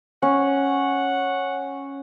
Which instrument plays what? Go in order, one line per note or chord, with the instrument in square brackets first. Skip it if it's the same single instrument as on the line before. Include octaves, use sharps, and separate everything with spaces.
[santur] C#4 [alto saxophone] F#5